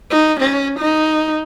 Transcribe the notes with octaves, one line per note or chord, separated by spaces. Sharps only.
D#4
C#4
D#4